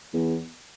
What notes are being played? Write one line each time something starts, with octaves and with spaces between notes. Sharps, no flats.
E2